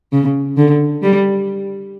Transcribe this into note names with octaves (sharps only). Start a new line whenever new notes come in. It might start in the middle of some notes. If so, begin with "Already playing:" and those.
C#3
D3
G3